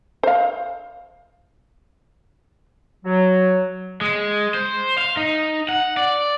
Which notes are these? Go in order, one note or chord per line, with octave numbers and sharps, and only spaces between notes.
C5 F5
F#3
G#3
C5
F5
D#4
F#5
D5